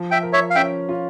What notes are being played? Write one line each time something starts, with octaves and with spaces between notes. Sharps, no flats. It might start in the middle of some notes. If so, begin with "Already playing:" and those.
Already playing: F3
E5 G5
A#4
C#5 E5
F5
C#4 E5 G5
F4